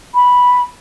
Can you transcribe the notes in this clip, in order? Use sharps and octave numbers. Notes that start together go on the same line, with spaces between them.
B5